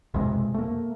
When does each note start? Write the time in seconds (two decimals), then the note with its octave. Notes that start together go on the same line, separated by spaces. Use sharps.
0.14 B1 F2 C3 G#3
0.54 A3 A#3